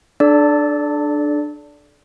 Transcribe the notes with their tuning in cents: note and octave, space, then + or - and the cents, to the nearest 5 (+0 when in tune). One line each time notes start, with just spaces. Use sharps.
D4 +15 A4 -35 D5 -15